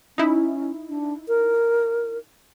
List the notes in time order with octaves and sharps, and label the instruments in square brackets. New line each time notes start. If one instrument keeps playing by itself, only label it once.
[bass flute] C#4 [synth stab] D#4 E4
[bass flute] D4
A#4